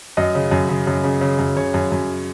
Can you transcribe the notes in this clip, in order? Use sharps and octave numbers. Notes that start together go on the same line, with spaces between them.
F#2 D#5
C#3
F#2
C#3
F#2
C#3
C#3
F#2
C#3 C#5
F#2
F#2